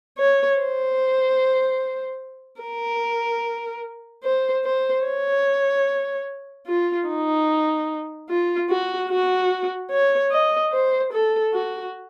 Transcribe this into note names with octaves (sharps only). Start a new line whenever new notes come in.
C#5
C5
A#4
C5
C5
C#5
F4
D#4
F4
F#4
F#4
C#5
D#5
C5
A4
F#4